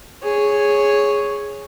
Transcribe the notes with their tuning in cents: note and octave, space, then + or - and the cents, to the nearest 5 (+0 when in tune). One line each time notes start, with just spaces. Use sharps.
G#4 +0 C#5 +0